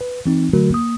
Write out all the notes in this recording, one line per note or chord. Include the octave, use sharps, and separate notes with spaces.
B4
E3 C4 D#4
D3 F#3 A3 F#4 A#4
A#3 D#6